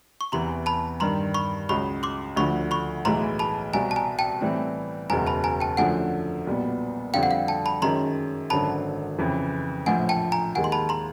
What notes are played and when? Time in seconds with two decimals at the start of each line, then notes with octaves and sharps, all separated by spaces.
0.21 C#6
0.32 E2 C3 E3 A#5 C6
0.66 A5 B5
1.00 G2 D#3 G3 A#5 C6
1.34 B5 C#6
1.69 C#2 C#3 F#3 B5 C#6
2.03 C6 D6
2.36 D2 D3 F3 B5 C#6
2.71 B5 C#6
3.05 B1 A2 E3 G#3 A#5 C6
3.39 A5 B5
3.73 C2 B2 G3 G#5 A#5
3.91 A5
3.96 G#5 A#5
4.19 G5 A5
4.41 A2 E3 G3 C4
5.10 F#1 E2 B2 G#3 G#5 A#5
5.27 A5 B5
5.44 G#5 A#5
5.60 G5 A5
5.77 F#2 D3 F3 A3 F#5 G#5
6.47 B1 A#2 G3 B3
7.14 F2 D3 G3 C4 F5 G5
7.23 F#5
7.31 F5
7.48 G5 A5
7.66 A5 B5
7.82 F#2 D#3 G#3 C#4 A#5 C6
8.50 G#1 F#2 D3 F#3 A5 B5
9.18 F2 C#3 E3
9.86 A#1 A2 F3 F#5 G#5
10.09 G5 A5
10.32 G#5 A#5
10.55 D#2 D#3 G#3 F#5 G#5
10.64 C6
10.72 A5 B5
10.89 A#5 C6